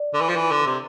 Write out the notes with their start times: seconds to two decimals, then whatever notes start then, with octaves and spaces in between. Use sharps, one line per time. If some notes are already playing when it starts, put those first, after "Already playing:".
Already playing: D5
0.14 D3
0.21 E3
0.29 F3
0.36 E3
0.51 D3
0.66 C3